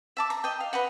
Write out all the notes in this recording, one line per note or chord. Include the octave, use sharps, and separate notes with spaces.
E5 A5 D6
A#5
D#5 G5
F5
B4 D#5 F#5